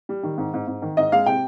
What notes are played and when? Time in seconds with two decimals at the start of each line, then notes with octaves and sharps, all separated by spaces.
0.09 G3
0.23 D#3
0.38 G#2
0.54 G#2
0.67 G#2
0.82 D#3
0.97 G#2 D#5
1.12 G#3 F5
1.26 C3 G5